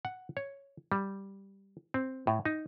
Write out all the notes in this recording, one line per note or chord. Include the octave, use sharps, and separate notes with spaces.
F#5
C#5
G3
C4
A2
D#4